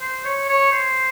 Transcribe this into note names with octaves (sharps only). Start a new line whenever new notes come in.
C5
C#5
C#5
C5